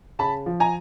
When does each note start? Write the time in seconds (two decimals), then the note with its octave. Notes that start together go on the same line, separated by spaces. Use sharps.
0.19 C#3 A5 B5
0.46 F3
0.60 G#5 A#5